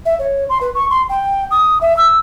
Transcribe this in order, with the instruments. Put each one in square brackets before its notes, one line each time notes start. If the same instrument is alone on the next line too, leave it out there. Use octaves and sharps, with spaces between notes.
[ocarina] E5
C#5
C6
B4
C#6
C6
G5
D#6
E5
E6